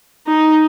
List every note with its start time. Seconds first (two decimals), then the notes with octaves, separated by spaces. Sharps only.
0.27 D#4